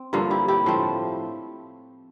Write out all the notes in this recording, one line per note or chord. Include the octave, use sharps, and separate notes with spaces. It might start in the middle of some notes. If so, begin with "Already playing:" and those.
Already playing: C4
G2 D3 F3 A#3 F4
E4 G4
E4 G4
A2 F3 A3 C4